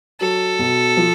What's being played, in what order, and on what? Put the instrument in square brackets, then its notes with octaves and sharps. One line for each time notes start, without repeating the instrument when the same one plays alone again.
[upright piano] F#3 [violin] A4
[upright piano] B2
F3